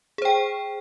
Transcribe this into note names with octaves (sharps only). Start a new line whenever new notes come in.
G#4 C5 G5